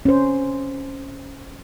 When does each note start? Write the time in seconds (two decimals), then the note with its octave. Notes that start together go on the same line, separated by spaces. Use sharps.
0.05 C#4 C5